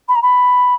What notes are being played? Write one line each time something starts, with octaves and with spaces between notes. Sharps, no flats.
B5
A#5
B5